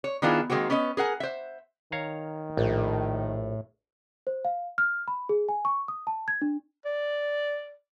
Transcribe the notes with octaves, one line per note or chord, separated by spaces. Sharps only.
C#5
D#3 B3 D4 E4 F4 G#4
D#3 G#3 A#3 C4 F#4
B3 C#4 B4 D#5
G#4 A#4 F#5 G#5
C5 E5
D#3 C#5 F5 A#5
A#1 A2
C5
F5
F6
B5
G#4
G#5
C#6
D#6
A5
G#6
D4
D5